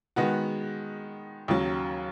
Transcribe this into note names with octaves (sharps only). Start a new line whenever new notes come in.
D#3 G#3 B3 F#4
D#2 C#3 F#3